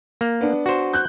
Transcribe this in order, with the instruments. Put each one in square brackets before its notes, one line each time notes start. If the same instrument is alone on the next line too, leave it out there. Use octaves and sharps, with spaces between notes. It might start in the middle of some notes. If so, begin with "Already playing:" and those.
[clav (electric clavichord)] A#3
[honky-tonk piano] B3 D4
[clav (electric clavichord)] F#4 C5
[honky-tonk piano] F#6 G6